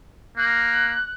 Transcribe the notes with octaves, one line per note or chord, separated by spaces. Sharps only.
A#3 F#6